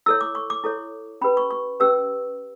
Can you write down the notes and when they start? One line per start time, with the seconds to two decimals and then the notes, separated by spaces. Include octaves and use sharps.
0.06 E4 A4 C#5 E6
0.21 D6
0.35 C#6
0.50 D6
0.64 E4 A4 C#5
1.21 C#4 G4 B4 B5
1.37 C#6
1.51 C#6
1.80 C#4 G4 B4 E6